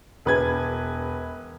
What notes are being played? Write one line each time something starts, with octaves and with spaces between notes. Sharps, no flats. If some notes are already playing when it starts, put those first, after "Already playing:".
E1 B4 G#6